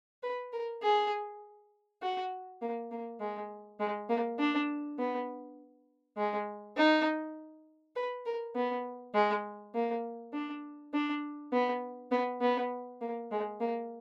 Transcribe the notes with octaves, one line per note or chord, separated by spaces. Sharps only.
B4
A#4
G#4
F#4
A#3
A#3
G#3
G#3
A#3
D4
B3
G#3
D#4
B4
A#4
B3
G#3
A#3
D4
D4
B3
B3
B3
A#3
G#3
A#3